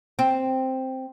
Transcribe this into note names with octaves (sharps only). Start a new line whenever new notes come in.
C4